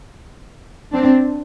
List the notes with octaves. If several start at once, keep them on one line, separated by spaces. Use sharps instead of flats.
C4 D4